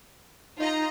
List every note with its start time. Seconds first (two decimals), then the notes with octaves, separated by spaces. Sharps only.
0.59 D#4 F4 D#5 A#5